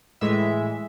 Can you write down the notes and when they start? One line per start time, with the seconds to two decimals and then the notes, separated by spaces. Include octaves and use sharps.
0.21 A2 E3 G#3 E5